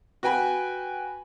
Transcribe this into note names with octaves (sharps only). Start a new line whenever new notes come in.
F#4 B4 G5 G#5 B5